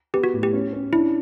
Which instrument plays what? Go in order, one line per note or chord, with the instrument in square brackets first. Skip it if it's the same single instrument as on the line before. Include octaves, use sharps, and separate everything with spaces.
[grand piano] B3 [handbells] G4
[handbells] F#4
[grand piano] A2
[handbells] G4
[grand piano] C#4
C#4
[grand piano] D4 [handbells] E4